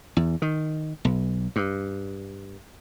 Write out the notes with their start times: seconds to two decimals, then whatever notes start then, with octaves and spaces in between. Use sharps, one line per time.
0.17 E2
0.42 D#3
1.05 B1
1.56 G2